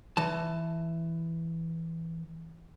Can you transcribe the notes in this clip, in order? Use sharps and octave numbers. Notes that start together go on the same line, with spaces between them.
E3 A5